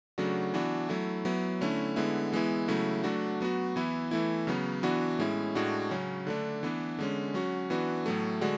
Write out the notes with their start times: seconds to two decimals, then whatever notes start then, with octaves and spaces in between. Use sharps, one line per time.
0.18 C#3 F#3 A3 D4 F#4
0.54 E3 B3 D4 F#4
0.89 F#3 A3 E4
1.25 F#3 B3 E4
1.61 D3 A3 C#4 E4
1.96 D3 G#3 B3 E4
2.33 E3 G#3 B3 E4
2.68 C#3 F#3 A3 E4
3.04 F#3 A3 D4 F#4
3.40 F#3 B3 F#4
3.76 E3 B3 E4
4.11 E3 A3 E4
4.47 C#3 F#3 B3
4.83 E3 B3 D4 F#4
5.19 A2 G#3 C#4 E4
5.55 A2 G#3 D4 F#4
5.91 C#3 F#3 C#4
6.27 D3 A3 D4
6.63 E3 B3 D4
6.98 D3 G#3 C#4
7.34 F#3 C#4 F#4
7.70 E3 B3 D4 F#4
8.06 A2 F#3 A3
8.41 D3 G#3 D4 F#4